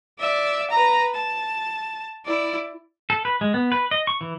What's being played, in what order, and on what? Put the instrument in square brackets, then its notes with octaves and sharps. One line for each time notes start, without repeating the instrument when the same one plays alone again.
[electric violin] D5 E5
B4 A#5
A5
E4 D5
[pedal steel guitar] A4
B4
G#3
B3
B4
D#5
C#6
E3